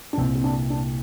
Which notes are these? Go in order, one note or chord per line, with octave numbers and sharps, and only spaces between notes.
D4
C2 A#2 C4
C4
D4
D4